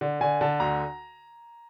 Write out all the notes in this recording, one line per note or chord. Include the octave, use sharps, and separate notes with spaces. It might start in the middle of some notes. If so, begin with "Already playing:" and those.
D3
D3 G#5
D3 A5
D2 A#5